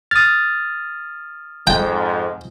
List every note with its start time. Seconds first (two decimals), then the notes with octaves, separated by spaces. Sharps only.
0.11 D#6 F6 A6
1.67 F2 G#2 G5